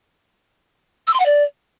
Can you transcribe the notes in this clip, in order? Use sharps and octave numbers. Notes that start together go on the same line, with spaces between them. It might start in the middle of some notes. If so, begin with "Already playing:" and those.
E6
C6
F#5
D5